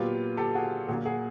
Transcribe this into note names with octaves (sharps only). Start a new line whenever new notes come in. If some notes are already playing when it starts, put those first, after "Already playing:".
Already playing: A#2 F#3 B3 F4 G4
G4 A4
F#4 G#4
A#2 F#3 A#3 F#4 G#4
F#4 G#4